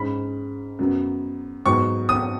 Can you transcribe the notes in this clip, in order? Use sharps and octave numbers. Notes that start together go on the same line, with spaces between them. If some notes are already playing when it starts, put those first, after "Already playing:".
Already playing: G#2 G#3 C#4 B5
F#2 F#3 B3
G#2 F#3 B3 C#6
D#6